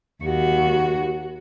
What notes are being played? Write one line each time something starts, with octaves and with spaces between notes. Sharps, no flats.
D#2 F#4